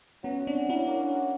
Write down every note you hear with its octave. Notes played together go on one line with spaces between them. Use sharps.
F#3 B3 C#4
F#4
C4 D4
C#4
F#3 D4 E4
A#3
C#4
F#4